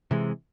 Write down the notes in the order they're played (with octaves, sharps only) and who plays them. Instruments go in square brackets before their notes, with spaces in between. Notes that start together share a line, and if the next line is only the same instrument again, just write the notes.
[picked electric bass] C3 E3 G#3